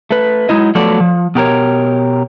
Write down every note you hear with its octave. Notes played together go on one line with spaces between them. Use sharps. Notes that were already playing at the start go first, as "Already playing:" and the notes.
A3 B4
F#3 G#3 D#4 E4 D#5
F3 F#3 A3 B3 A4 D5
F3
B2 G4 A#4 C#5